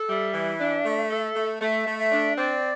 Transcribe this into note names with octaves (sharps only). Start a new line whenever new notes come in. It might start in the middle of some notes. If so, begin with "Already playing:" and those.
Already playing: A4
G3 E5
E3
D4
A3
A4
A3
A3 E5
A3
E5
D4
C4 D5